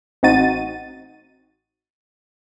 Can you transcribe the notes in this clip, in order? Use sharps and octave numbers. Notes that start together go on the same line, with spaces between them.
A1 C4 D#4 F#4 A6 D#7